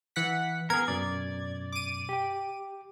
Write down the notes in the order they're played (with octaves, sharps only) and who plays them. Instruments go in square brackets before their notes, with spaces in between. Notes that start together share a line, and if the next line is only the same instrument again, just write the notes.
[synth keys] E3 F#5 B6
[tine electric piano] B3 [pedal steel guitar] G#4 A#4 [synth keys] G#6
[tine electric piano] F#2 B2 [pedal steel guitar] D5
[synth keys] D6 D#7
[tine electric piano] G4 G5